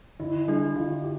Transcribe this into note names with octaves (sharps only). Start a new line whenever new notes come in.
D3 E4
G3 D4 G4
D3 F4
G4